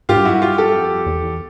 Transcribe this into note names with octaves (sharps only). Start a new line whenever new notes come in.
G#2 F4 G4
G2
F#2 E4 F#4
G2
F4 G4
G4 A4
F2
E2